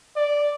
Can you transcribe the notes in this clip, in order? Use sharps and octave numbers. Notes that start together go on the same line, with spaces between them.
D5